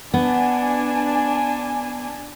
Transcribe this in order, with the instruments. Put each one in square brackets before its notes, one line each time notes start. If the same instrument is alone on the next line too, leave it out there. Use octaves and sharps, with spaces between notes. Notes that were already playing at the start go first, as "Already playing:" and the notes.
[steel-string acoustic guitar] B3 [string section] D4 G#5